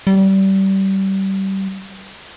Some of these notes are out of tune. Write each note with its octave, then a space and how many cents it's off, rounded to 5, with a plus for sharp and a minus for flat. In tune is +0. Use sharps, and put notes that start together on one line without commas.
G3 -25